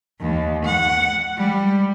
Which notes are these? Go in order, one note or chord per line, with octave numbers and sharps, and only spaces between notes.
D#2
F#5
G3